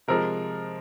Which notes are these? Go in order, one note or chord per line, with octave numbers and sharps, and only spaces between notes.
C3 F3 G#3 A#4